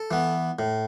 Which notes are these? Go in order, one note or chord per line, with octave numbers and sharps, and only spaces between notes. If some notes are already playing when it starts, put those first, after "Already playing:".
Already playing: A4
E3 B3
A2